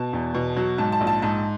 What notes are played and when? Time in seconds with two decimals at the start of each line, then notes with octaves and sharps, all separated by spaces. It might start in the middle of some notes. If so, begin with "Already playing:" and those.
Already playing: B2 A5
0.13 E2
0.34 B2
0.56 F#3
0.78 G#2 A5
0.92 A5
1.01 A#1
1.07 A5
1.22 G#2 A5